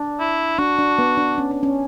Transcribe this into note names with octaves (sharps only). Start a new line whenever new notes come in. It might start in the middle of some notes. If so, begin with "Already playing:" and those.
Already playing: D4
E4
D4 F#4
D4
B3
D4
C#4
D4
C#4